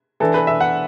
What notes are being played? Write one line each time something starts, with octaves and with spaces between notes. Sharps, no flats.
E3 D4 A4
B4
E5
F#5